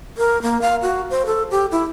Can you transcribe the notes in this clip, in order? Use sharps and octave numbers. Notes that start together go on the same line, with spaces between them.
A#4
A#3
F5
F#4
C5
A4
G4
E4